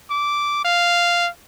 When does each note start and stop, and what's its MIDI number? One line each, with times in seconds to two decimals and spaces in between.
0.11 0.64 86
0.65 1.29 77